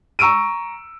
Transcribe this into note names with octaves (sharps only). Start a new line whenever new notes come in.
A#5 C#6 E6 D7 D#7